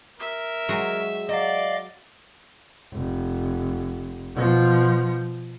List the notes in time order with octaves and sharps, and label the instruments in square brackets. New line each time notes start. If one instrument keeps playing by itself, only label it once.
[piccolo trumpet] A#4 [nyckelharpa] E5
[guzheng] F#3 G#3 F#4
[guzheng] F#3 [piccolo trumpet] D5 [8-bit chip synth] D#5 F5
[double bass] F1
B2 F3